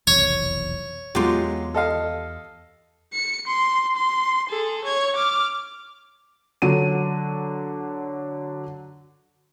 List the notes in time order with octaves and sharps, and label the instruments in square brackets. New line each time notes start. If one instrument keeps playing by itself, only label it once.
[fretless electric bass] F1 B1 E2 [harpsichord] C#5
[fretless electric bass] E2 B3 [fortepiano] F#3 G#3 [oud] F4 G4
[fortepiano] A4 D#5 F5
[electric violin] C#7
C6
C6
G#4 A4
C#5 G#6
D6 F6
[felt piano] D3 F#3 D#7